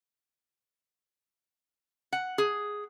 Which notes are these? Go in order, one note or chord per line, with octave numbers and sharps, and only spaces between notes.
F#5
G#4